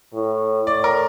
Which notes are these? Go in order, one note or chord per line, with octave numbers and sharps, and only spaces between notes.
A2
A2 D5
A#4